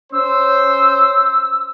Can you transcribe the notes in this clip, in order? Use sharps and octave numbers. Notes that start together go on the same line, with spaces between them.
C#4 C5 E6